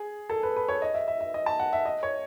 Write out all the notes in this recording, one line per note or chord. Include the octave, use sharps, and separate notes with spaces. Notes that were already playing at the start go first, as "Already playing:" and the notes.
Already playing: G#4
A4
B4
B4
C#5
D#5
E5
E5
E5
D#5
A5
F#5
E5
D#5
C#5